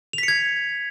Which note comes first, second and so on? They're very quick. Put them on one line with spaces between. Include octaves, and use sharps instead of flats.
F7 B6 C#7 G#6